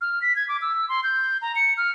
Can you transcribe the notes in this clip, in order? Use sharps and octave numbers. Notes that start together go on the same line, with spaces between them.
F6
B6
G#6
D6
E6
C6
G6
A#5
C#7
F6